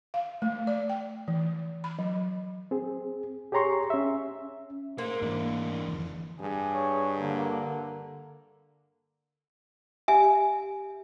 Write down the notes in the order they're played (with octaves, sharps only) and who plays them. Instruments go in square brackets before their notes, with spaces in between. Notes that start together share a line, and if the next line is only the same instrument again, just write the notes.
[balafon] F5
A3
D5
G5
E3
B5
F#3
[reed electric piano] C4 G#4
G4 G#4 C#5 A#5 C6 C#6
C#4 E5
[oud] A#3 [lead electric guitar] G#4 C5
[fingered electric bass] G#2 A3 [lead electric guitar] E3 D4
[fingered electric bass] F2 D3 E3
[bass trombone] G2 [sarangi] G#4
[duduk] C#5
[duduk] D3 [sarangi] A#3
[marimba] G4 [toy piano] E5 G#5